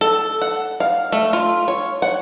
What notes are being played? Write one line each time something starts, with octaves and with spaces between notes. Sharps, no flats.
A4
F#5
F5
A3
F4
C#5
F#5